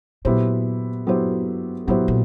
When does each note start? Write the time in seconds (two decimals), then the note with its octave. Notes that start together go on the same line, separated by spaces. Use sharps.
0.25 A#2 F#3 B3 E4 G4 C5
1.07 F#3 B3 E4 G4 C5
1.87 A2 F#3 B3 E4 G4 C5
2.08 A#2